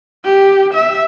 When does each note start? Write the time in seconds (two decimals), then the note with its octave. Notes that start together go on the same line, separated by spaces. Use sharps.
0.25 G4
0.74 E5